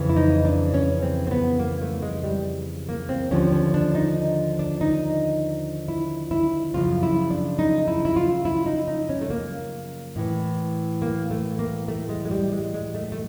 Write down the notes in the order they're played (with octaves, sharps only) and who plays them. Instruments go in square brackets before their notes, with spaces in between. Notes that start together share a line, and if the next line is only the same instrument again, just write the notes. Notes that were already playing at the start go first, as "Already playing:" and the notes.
Already playing: [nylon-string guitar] F2 C#3 E3
E4
D#4
D4
C#4
C4
C4
B3
A#3
A3
G#3
G3
A#3
C4
D#2 D3 F3 C#4
C#4
D4
D#4
D4
D#4
E4
E4
F#2 C#3 F3 F4
E4
D4
D#4
E4
E4
F4
E4
D#4
D#4
C#4
A3
A#3
A2 E3
A#3
A3
A#3
A3
G#3
G#3
G3
G#3
G#3
A3
A3